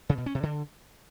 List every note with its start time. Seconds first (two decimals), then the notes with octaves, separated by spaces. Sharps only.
0.09 C#3
0.18 B2
0.26 C#4
0.35 C3
0.43 D3